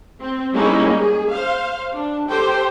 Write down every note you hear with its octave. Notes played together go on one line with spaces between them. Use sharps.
C4
G3 G#3 A#3 C#4 D#4 E4
G#4
C5 F5
D4
G4 A4 C5 G5